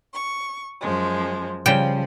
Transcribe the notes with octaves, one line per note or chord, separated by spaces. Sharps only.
C#6
F#2 F3 G#3
C#3 F3 G3 G5